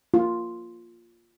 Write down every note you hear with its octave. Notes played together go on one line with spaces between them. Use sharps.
F4